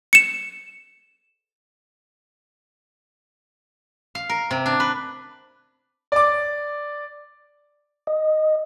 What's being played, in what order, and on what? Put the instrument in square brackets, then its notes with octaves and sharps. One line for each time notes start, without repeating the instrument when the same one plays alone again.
[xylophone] C#7 E7
[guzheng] F5
A#4
C3
D4
B4
[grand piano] D5 D6
[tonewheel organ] D#5